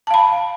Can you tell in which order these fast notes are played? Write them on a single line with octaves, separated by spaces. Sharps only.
A5 F5 B5